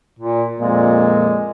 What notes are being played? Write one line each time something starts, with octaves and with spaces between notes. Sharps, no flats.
A#2
F2 A#2 G#3